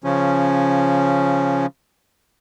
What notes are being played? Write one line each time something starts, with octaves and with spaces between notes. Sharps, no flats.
C#3 F3 C#4